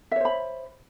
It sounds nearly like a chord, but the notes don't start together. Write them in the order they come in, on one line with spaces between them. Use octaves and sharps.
E5 C#5 C5 B5